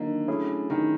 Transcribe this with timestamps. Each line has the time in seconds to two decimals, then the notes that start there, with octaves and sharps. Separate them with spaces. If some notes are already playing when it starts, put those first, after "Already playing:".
Already playing: D3 D#3 F#3 A#3 D#4
0.28 F#3 A3 C#4 E4 G#4
0.70 D#3